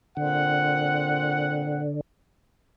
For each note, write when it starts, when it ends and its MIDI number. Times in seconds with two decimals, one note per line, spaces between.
0.17 1.83 46
0.17 2.01 50
0.17 1.83 60
0.17 1.83 78